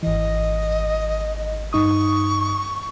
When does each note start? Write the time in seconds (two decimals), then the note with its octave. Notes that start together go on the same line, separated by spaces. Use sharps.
0.03 G#1 E3 D#5
1.73 G2 D#4 C#6 D#6